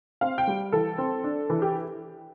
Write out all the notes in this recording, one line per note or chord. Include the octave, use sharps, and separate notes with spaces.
C4 F5
G5
G3
E3 A4
C4
D4
E3
G4